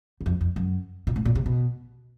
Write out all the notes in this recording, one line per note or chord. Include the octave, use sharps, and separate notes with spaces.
E2
F2
F2
F#2
A#2
A2
A#2
C3
B2